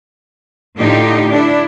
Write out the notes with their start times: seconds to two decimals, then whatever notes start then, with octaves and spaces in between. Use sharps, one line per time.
0.78 A2 D3 D#4 F4 G4
1.31 D4 E4